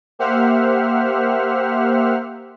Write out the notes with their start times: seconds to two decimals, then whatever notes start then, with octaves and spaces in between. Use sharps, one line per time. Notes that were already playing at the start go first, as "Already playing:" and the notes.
0.19 A#3 G4 C5 E5 F#5 F6